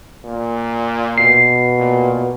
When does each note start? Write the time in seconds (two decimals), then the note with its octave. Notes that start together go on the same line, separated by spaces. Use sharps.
0.24 A#2
1.18 B2 C7
1.79 A#2